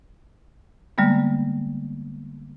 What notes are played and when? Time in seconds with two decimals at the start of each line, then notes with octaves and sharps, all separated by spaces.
0.98 D3 G3 G#3 A#3 B3